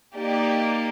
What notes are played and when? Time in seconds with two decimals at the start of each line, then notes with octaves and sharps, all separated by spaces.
0.15 A#3 D#4 G4 D5